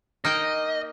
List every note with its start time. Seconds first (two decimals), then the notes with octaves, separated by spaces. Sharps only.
0.25 A#3 D#4 D#5 G5